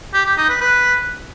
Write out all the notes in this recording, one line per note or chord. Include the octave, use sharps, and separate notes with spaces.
G4
G4
D#4
B4
B4